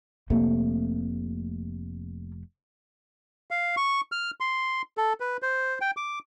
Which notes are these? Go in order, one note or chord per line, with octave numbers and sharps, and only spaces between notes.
F1 C3 A3 A#3
F5
C#6
F6
C6
A4
B4
C5
G5
D6